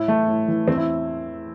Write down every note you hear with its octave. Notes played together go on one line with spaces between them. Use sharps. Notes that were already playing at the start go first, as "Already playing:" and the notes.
Already playing: A2 E4
E3 A3
A2
E3
E2 C4
E4